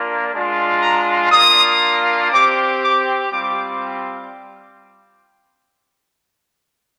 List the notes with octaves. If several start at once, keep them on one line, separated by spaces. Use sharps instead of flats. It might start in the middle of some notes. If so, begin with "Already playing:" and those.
Already playing: A#3 D4 F4
G#3 D4 F4
A#5
A#3 D4 F4 D#6
C4 G4 D6
D6
G3 C4 F4 D6